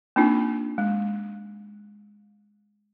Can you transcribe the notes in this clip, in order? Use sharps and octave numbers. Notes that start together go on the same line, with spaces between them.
A#3 C4 D4 D#4 F4
G#3